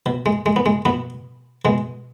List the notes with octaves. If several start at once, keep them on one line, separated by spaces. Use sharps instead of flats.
B2
G#3
G#3
B3
G#3
B2 B3
B2 G#3